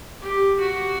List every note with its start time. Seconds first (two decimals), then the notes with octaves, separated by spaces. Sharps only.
0.21 G4
0.60 F#4